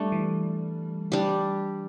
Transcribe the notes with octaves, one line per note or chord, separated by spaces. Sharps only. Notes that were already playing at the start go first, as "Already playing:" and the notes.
Already playing: G3 A3 D4 A4
E3
G3 D4 G4